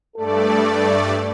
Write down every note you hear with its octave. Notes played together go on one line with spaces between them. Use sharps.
G2 A3 A4 D5